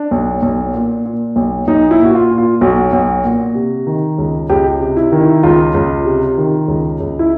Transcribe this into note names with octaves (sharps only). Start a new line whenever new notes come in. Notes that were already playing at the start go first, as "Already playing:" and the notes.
Already playing: D4
B1
B1
A#2
A#2
B1
B1 D#4
E4
A#2
F#4
F4
A#2
F4
B1 F#4
B1
A#2
C3
D#3
C#2
C#2 G4
C3
E4
D#3
E4
C#2 F4
C#2
C3
D#3
C#2
C#2
E4